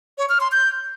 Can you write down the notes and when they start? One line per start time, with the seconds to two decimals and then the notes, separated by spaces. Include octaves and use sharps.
0.18 C#5
0.29 F6
0.41 C6
0.52 G6